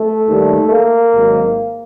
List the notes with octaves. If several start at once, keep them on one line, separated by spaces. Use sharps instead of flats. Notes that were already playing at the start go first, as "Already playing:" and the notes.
Already playing: A3
D#2 D#3 G3
A#3
G#1 G#2 D#3 F#3